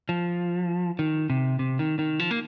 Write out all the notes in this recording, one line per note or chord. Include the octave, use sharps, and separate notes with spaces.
F3
D#3
C3
C3
D#3
D#3
F3
A#3